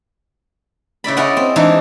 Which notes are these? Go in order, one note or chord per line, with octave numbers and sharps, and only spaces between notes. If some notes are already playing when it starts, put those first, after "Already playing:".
C#3 E4 D5 B5
C#4 E4 D5 D#5 F#5
C4
E3 G#3 A3 D4 D#4 A4